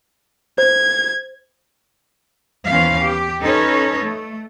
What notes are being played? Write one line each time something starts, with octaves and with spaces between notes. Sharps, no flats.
C5 G#6
D#2 E3 B3 C#4 C5 F5
G4
C#4 D#4 A4 B4 C#5
A3